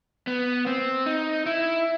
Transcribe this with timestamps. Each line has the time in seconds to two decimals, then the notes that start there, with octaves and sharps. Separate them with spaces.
0.27 B3
0.67 C4
1.06 D#4
1.46 E4